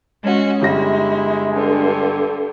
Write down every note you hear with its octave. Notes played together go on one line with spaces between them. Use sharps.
G#3 C#4 F#4
G1 G3 G#3 E4 A#6
G2 D3